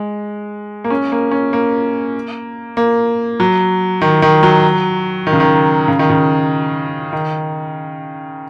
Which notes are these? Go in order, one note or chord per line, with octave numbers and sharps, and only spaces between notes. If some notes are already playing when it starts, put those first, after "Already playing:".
Already playing: G#3
A#3
C#4
A#3
C#4
A#3
A#3
F#3
D#3
D#3
F#3
D#3
C#3
D#3
C#3
D#3
C#3
D#3